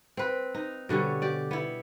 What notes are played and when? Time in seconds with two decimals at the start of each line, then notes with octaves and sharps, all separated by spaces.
0.17 C4 B4
0.54 D#4
0.89 B2 D3 G3 C#4
1.22 G4 D5
1.51 B3 E4